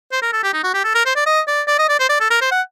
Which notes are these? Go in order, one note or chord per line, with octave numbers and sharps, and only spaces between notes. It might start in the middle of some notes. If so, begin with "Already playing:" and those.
C5
A#4
A4
G4
D#4
F#4
G4
A4
A#4
C5
D5
D#5
D5
D5
D#5
D5
C5
D5
A4
A#4
C5
F#5